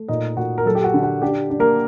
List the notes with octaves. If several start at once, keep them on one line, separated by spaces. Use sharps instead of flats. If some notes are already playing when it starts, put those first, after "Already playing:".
Already playing: A3
A#2 D#4 D#5
A#2 F#4
A#4
F#3 A4
G4
F#4
D3
F#4
D4 G4
D4
A#3 A#4